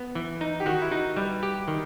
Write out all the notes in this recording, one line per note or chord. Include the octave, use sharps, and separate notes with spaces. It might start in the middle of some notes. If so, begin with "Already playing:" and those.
Already playing: B3
E3
D#4
G4
D#3 F#4
E4
D#4 F#4
G3 B4
G4
D#3